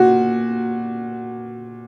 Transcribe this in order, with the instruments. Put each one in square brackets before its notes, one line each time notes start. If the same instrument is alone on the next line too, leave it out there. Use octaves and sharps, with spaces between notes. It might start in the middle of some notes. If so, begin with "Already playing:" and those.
Already playing: [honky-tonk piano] A#2 F#4